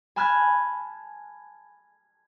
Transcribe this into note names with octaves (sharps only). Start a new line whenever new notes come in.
G#5 A5 B5 F6 F#6 G#6